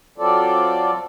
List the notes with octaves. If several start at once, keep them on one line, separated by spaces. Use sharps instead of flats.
F#3 C4 F4 A4 D5